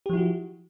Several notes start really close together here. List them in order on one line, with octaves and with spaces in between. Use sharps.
G4 F3 E4 F#4